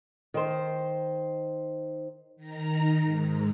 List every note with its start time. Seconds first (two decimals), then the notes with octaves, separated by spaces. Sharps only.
0.34 D#3 C5
2.36 D#3 A#5
3.03 G#2